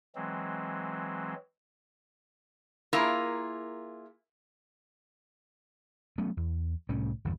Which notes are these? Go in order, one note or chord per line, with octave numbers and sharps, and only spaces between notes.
E3 F#3 G#3 C4
A#3 E4 F4 G#4 A#4
F#3 A3 B3 C#4
E2
C2 A2 G3 C#4
G1 E2 G2